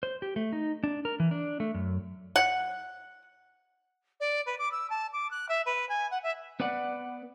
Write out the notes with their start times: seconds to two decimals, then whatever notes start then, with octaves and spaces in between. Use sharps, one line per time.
0.03 C5
0.22 G4
0.36 A3
0.53 D#4
0.84 D4
1.05 A#4
1.20 E3
1.31 D4
1.60 A3
1.75 F#2
2.36 F#5
4.20 D5
4.46 B4
4.58 D6
4.71 E6
4.90 A5
5.12 D6
5.31 F#6
5.49 E5
5.65 B4
5.89 G#5
6.11 F#5
6.23 E5
6.60 B3 B4 D5 F#5